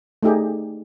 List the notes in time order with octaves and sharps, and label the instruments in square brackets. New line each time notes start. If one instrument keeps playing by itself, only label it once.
[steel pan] A3 D#4 G4 G#4